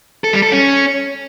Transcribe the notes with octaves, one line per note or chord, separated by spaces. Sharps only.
A4
G3
A4
C#4